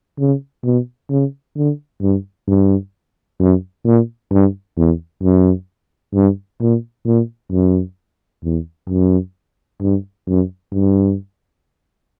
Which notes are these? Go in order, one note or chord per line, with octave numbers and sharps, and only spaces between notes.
C#3
B2
C#3
D3
G2
G2
F#2
A#2
G2
E2
F#2
G2
A#2
A#2
F#2
E2
F#2
G2
F#2
G2